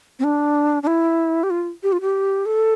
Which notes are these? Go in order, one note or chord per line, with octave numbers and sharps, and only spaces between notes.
C4
D4
D4
E4
G4
F4
G4
F4
G4
A4